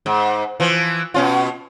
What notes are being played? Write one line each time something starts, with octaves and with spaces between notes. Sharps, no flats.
G#2
E3 F3
B2 C#4 F4